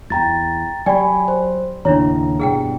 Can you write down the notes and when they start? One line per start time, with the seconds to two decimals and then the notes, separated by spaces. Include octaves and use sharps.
0.10 E2 G5 A#5 A6
0.86 F#3 G4 D5 G5 G#5 B5
1.28 C5
1.85 D#2 A2 C#3 D4 E4 C#5 A#5
2.40 G2 B2 G#4 F#5 G5